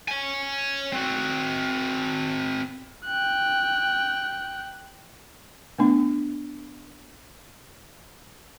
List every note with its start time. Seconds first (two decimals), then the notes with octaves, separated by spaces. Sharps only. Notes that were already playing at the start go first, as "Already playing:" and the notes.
0.08 C#5 G#5
0.93 C4 F#4
3.06 G5 F#6
5.78 A3 B3 D4